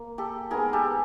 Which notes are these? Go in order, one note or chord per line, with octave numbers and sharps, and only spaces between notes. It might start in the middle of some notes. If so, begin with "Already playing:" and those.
Already playing: A#3
G4 A4
G#3 B3 D#4 G#4 A#4
G4 A4